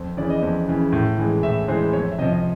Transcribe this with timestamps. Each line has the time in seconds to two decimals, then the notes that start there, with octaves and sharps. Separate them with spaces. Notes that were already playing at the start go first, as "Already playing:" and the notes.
Already playing: F2
0.17 C#3 E3 D5
0.30 D#5
0.42 F2
0.67 C#3 E3
0.92 A2
1.18 E3 G#3
1.43 A2 E5
1.68 E3 G#3 C5
1.93 F2 C#5
2.12 E5
2.19 C3 F3 D#5
2.33 D#5